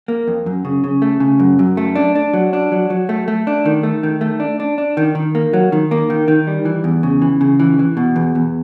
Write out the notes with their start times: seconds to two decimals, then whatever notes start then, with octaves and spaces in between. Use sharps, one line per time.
0.08 A#3
0.28 F2
0.46 F#2
0.65 C#3
0.84 C#3
1.02 A3
1.20 C#3
1.39 F#2
1.59 F#2
1.77 A3
1.95 D4
2.15 D4
2.34 F#3
2.53 D4
2.72 F#3
2.90 F#3
3.09 A3
3.28 A3
3.47 D4
3.66 D#3
3.83 A3
4.03 D#3
4.21 A3
4.40 D4
4.60 D4
4.78 D4
4.97 D#3
5.15 D#3
5.35 A#3
5.53 F#3
5.72 D#3
5.91 A#3
6.10 D#3
6.28 D#3
6.47 G3
6.65 E3
6.84 E2
7.03 C#3
7.22 E3
7.41 C#3
7.60 E3
7.79 E3
7.97 B2
8.16 E2
8.35 E2